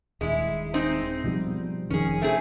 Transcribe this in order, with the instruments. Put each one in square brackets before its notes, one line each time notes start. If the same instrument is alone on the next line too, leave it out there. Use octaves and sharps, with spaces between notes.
[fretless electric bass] D#1 [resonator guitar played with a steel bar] G#3 E4
[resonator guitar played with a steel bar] G#3 C4 D#4
[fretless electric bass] B2 F3 G3
[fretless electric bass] F1 F2 D#3 [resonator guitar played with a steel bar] C#4 G#4
[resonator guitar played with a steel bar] A3 C4 G#4